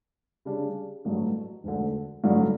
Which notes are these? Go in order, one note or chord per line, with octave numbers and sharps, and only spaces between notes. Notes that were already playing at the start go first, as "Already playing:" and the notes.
C#3 G3 D4
A1 G2 F#3 A3
E1 D2 D3
A1 G2 D3 F#3